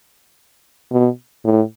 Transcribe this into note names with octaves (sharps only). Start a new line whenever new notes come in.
B2
A2